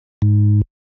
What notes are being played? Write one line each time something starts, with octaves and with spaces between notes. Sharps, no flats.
G#2